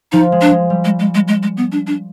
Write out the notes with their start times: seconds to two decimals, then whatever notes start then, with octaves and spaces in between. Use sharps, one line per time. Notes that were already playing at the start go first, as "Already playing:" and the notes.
0.12 F3 D#4
0.32 G#3
0.41 D4
0.51 G#3
0.70 G3
0.85 G#3
0.99 G#3
1.15 G#3
1.28 G#3
1.43 G#3
1.57 B3
1.72 D4
1.87 D4